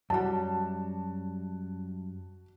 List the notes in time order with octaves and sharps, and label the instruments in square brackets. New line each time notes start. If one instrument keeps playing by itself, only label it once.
[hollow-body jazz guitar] F#2 G3 [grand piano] F#4 A5